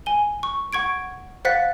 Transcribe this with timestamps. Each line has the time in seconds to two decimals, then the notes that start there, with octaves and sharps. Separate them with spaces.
0.06 G#5 G7
0.43 C#6
0.73 F#5 C#6 G#6 D7
1.45 C5 F5 F#5 F#6 A6 B6